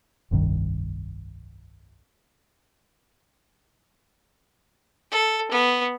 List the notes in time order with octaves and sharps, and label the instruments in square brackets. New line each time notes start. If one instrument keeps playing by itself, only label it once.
[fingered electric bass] F1 C2 G2 D#3
[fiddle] A4
B3